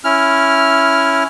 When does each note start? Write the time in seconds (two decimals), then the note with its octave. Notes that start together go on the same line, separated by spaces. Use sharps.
0.04 C#4 E4 F6